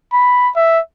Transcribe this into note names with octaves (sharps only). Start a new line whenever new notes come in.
B5
E5